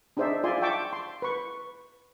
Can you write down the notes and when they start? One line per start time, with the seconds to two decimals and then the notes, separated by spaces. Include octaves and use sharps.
0.17 D4 D#4 G#4 C5 D5 E5
0.44 F4 D5 E5 G#5 C6
0.61 E5 G5 A5 C#6 D6
0.93 C6
1.22 B4 C#6